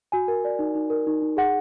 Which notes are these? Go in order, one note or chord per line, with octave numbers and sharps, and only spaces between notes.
F#4 G#5
A#4
D5
D#4
D#4
A#4
D#4
D#4
G#4 F#5